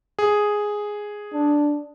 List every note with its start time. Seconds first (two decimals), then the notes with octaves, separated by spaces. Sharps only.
0.19 G#4
1.33 D4